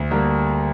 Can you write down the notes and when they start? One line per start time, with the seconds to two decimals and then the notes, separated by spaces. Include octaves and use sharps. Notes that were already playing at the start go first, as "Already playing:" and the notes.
Already playing: D2
0.11 D3 G3 A#3